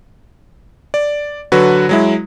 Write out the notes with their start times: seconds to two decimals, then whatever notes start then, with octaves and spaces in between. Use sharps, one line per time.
0.94 D5
1.52 D3 F#3 F#4 B4
1.89 F#3 G#3 E4